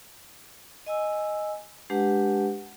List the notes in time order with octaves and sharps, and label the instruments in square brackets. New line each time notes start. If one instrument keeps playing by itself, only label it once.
[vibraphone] D#5 G#5 E6
G#3 D4 G4 B4 F#5 A5